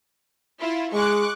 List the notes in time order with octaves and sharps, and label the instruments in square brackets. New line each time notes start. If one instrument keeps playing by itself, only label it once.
[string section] E4 F4
[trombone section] G#3 [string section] C#6 D6 F#6